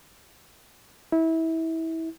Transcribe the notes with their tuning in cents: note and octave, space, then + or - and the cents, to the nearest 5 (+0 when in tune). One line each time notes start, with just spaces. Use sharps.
E4 -25